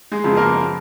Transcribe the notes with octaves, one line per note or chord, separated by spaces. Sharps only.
G#3 G#4
F#2 C#3 F3 B3
A#3 A#4